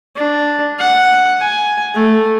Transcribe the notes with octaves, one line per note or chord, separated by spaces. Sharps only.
D4
F#5
G#5
A3